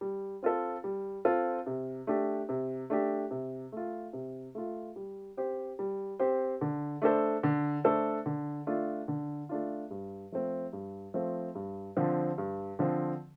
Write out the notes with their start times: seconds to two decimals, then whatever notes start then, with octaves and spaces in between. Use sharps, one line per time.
0.01 G3
0.43 C4 F4 A4
0.84 G3
1.25 C4 F4 A4
1.66 C3
2.07 A3 D4 G4
2.49 C3
2.90 A3 D4 G4
3.31 C3
3.72 A3 F4
4.13 C3
4.55 A3 F4
4.96 G3
5.37 C4 G4 C5
5.79 G3
6.19 C4 G4 C5
6.61 D3
7.02 A3 D4 A4 C5
7.43 D3
7.84 A3 D4 A4 C5
8.26 D3
8.67 A3 D4 F4
9.08 D3
9.49 A3 D4 F4
9.91 G2
10.32 F3 A3 C4
10.73 G2
11.14 F3 A3 C4
11.55 G2
11.96 D3 F3 C4
12.38 G2
12.79 D3 F3 C4